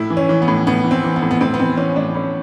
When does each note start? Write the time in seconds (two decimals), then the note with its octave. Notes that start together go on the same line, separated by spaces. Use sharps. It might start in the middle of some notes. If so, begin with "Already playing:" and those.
Already playing: A2 E4
0.10 E3
0.17 C#4
0.29 E3
0.42 B3
0.48 A2
0.67 A2 B3
0.84 E3
0.91 C4
1.04 E3
1.16 B3
1.22 A2
1.31 B3
1.41 A2 C4
1.54 B3
1.59 E3 C4
1.77 E3 C#4
1.96 A2 D4
2.15 A2 C#4